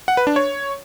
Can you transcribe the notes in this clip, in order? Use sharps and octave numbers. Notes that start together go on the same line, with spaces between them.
F#5
B4
D4
C#5